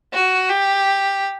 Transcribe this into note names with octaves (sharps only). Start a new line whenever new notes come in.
F#4
G4